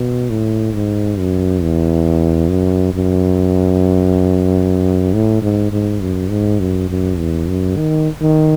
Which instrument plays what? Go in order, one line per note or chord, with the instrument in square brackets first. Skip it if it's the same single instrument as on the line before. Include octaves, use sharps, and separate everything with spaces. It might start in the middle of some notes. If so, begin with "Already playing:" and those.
Already playing: [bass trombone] B2
A2
G#2
F#2
E2
F#2
F#2
A2
G#2
G#2
F#2
G#2
F#2
F#2
E2
F#2
D#3
D#3